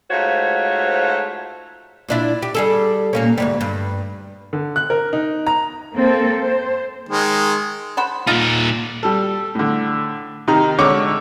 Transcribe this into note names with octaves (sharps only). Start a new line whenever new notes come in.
G#2 A3 F4 F#4 C5 C#5
A#2 D4 E4
G4
G3 G#4 A4
A#2 A#3 C#4
D2 G#2 G3
G2
D3
F#6
A#4
D#4
A#5
A#3 C4 A4 C5
C5
D#3 G#3
C5 F#5 B5
A#2 D#4 F4
G3 A4
A2 D3
C3 D#3 D#4 A#5
G#1 D3 C#5 C#6 D6